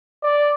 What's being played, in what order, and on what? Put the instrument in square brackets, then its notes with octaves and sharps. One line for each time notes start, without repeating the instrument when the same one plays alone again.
[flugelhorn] D5